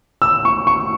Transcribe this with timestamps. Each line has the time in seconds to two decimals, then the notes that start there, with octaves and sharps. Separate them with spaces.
0.22 E6
0.45 C#6
0.67 C#6